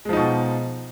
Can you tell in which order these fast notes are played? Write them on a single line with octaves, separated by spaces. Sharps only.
G#3 F3 D#4 B2